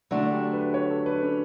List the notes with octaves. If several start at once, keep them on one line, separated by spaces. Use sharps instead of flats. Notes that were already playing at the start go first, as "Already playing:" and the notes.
D3 F#3 A3 D4 E4
G4
B4
C#5
A4
B4
C#4